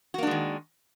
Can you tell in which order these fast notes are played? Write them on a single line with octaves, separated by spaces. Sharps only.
F#4 A#3 D4 G#3 D#3